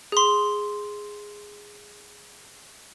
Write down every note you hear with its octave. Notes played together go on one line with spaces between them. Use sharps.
G#4 C6